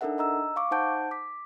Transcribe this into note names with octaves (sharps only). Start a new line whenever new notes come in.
D4 D#4 A4 A#4 E5 F#5
D#5 A#5 E6
F5 C#6 D6
D#4 C5 F#5 A5 G6 D7
D6 B6